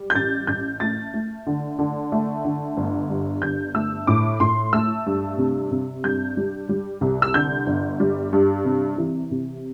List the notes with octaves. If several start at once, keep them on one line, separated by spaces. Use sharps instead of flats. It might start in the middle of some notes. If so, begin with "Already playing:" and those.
Already playing: G3
G6
A1 A6
A1 G6
A3 A6
A3
D3
D3
A3
D3
G1
G2
G1 G6
A3 E6
A2 D6
A2 C6
A3 E6
G2
C3
C3
G2 G6
G3
G3
C2
E6
D3 G6
G1
G3
G2
C3
E3
C3